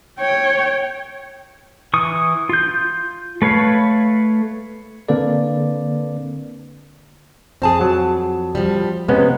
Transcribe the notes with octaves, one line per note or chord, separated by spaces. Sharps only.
C#5 G5
E3 C#6 D#6
F4 G6
A3 B4 C#5 F5
D3 A#3 C4 A4 B4 D5
F2 C4 G#4 A5
F#3
F3 G3
C3 G#3 B3 C#4